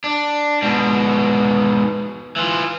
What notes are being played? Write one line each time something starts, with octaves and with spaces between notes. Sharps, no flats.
D4
G#2 B2
E3 F4